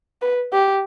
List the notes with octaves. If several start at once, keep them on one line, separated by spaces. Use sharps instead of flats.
B4
G4